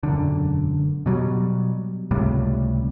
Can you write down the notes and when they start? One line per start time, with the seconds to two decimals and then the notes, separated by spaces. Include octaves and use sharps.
0.03 E1 F#2 D3
1.06 B2 F#3 G3
2.11 C#2 A2 C3 G3